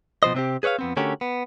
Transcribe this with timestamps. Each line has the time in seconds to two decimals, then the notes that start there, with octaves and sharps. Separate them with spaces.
0.23 B2 F3 C5 D#5
0.34 C3 C4 G4
0.63 G#4 B4 C#5 E5 F5
0.79 F2 B3 C4
0.97 D3 A3 C#4 F#4 G4 A#4
1.21 B3